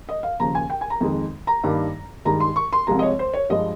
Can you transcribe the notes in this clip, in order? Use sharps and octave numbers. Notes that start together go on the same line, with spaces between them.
D#5
F5
D#2 C#3 F3 A#5
G#5
G5
G#5
A#5
F2 D#3 G#3
A#5
G2 D#3 G3 A#3
G2 D#3 G#3 A#5
C6
C#6
C6
C2 C3 F3 G#3 A#5
D#5
C#5
C5
C#5
G2 F3 G#3 D#5